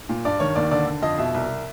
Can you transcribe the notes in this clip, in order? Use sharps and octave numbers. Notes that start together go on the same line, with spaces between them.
A#2
G2 D5
D#3 C#5
D#2 D5
D3 D5
D3
F2 D#5
B2 E5
C2